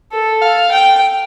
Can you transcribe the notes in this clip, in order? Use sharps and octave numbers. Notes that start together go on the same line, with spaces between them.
A4
F5
G5